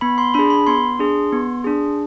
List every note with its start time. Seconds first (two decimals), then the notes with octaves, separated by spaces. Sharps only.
0.01 B3 B5
0.18 C6
0.34 D4 G#4 B5
0.50 B5
0.67 B3 C6
1.00 D4 G#4
1.33 B3
1.64 D4 G#4